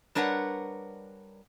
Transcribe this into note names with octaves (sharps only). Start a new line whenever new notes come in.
G3 D4 A#4 B4 C#5 F#5